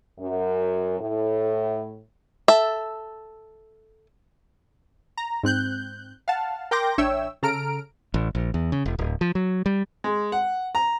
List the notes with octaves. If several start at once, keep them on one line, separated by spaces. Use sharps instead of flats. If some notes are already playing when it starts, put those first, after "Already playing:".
F#2
A2
A4 E5
A#5
G#2 C4 F#6 G6
F5 F#5 A5
A#4 G5 C6 D6 G6 A#6
A1 D4 C#5 E5 G5 E6
C#3 A4 A#5 F6 D7
A1
A#1
E2
C#3
E1
D1
F3
F#3
G3
G#3
F#5
A#5